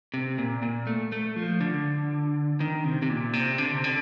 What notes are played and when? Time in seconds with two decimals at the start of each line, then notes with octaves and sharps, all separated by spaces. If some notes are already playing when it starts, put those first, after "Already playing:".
0.14 C3
0.38 A#2
0.62 A#2
0.87 A3
1.12 A3
1.36 F3
1.61 D3
2.60 D#3
2.84 C3
3.02 C3
3.09 A#2
3.33 C3
3.58 D3
3.72 C3
3.84 D3